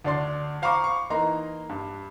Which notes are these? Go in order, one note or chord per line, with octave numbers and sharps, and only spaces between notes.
D2 D4 D5 C6
C5 F5 A#5 B5 C#6 D6
C#6
E3 A#3 D#4 A#5 C6
G2